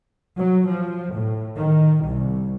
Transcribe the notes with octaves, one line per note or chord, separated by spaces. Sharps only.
F#3
F3
A2
D#3
C2